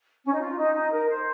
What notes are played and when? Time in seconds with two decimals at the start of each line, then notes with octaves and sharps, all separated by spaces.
0.24 C#4
0.32 D#4
0.41 F4
0.57 D#4
0.75 D#4
0.92 A#4
1.09 C5